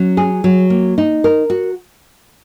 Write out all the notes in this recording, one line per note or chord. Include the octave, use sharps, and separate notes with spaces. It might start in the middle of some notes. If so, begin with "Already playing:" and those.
Already playing: F#3 C#4
G#4
F#3
A#3
D#4
A#4
F#4